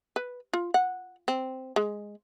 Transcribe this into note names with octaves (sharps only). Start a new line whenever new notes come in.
B4
F4
F#5
C4
G#3